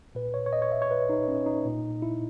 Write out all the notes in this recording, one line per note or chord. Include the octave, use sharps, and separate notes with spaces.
A#2 B4
C#5
C#5
D#5
C#5
E5
C#5
B4
D#4
C#4
D#4
A#2
E4